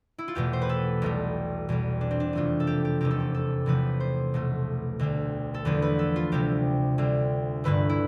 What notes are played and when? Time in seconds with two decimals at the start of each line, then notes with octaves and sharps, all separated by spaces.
0.18 E4
0.28 F4
0.35 E2 B2 A3 G4
0.53 C5
0.62 B4
0.69 A4
1.02 B1 B2 G3
1.69 E2 B2 G3
2.01 D4
2.11 C4
2.20 D4
2.33 F2 C3 E3 A3 F4
2.60 A4
2.67 G4
2.85 G4
3.01 F1 E2 C3 G4
3.11 A4
3.20 G4
3.34 A4
3.66 E2 C3 F3 A3 B4
4.00 C5
4.34 B1 B2 A3
4.99 D2 D3 G3
5.54 A4
5.65 E2 D3 F3 A3 B4
5.82 B4
5.99 A4
6.16 F4
6.32 D2 C3 G3 G4
6.98 D2 D3 G3
7.64 G1 G2 D3 A3 B4
7.89 E4